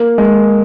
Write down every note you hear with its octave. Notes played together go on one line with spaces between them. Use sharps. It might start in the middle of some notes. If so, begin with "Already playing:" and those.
Already playing: A#3
G#3